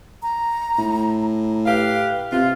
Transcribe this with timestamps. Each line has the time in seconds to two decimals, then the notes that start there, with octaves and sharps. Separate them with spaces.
0.23 A#5
0.78 A2
1.66 G4 B4 F5
2.32 C3 F4